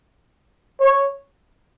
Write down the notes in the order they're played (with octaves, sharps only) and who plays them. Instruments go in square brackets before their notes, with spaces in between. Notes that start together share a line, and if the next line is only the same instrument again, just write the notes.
[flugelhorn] C#5